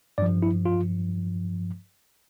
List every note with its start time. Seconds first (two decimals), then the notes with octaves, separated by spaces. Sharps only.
0.18 G2 F3 D5
0.42 E4
0.65 F4